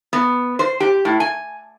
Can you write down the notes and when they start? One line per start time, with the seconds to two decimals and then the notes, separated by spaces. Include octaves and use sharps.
0.13 B3
0.59 C5
0.80 G4
1.05 A2
1.20 G#5